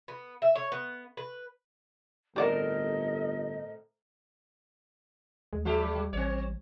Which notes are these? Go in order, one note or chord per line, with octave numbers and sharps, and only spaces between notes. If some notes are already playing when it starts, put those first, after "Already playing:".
B3
E5
C#5
B3
B4
G1 A2 C4 G4 A#4 D5 D#5 F#5
D#2 G#3
G2 F#3 G#3 G4
G3
A1 C4 C#5